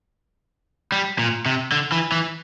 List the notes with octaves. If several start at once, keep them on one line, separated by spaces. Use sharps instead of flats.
G3
A#2
C3
D3
E3
E3